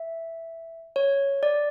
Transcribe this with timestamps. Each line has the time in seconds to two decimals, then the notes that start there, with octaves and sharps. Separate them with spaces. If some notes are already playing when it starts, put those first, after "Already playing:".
Already playing: E5
0.96 C#5
1.43 D5